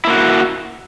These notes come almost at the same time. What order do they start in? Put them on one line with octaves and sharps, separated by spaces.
E4 A#3 F#4